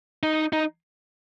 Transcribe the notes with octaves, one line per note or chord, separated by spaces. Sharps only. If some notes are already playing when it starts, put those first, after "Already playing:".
D#4
D#4